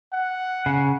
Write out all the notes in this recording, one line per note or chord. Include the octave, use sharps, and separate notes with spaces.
F#5
C#3